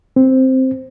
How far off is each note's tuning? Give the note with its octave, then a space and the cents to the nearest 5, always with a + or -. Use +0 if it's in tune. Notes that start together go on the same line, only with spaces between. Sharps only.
C4 +0